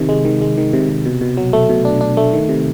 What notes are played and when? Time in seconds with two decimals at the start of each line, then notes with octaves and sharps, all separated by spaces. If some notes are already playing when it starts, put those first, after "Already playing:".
Already playing: C3 D#3
0.09 G#3
0.25 D#3
0.41 G#3
0.58 D#3
0.73 C3
0.89 C3
1.05 B2
1.21 B2
1.37 F#3
1.53 A3
1.69 B2
1.85 D4
2.01 D4
2.17 A3
2.33 D#3
2.49 C3